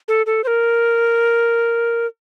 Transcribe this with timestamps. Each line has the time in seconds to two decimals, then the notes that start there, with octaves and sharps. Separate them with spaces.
0.08 A4
0.26 A4
0.44 C5
0.47 A#4